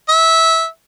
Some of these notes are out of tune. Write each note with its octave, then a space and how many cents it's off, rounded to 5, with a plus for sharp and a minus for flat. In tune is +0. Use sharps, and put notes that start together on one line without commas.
E5 -15